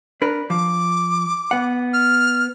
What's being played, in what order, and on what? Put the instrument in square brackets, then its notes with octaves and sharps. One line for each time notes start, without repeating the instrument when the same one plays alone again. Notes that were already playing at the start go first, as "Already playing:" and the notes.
[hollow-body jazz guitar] D4 A#4 B4
[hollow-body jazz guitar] F3 [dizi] D6
[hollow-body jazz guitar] B3 F#5
[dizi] F6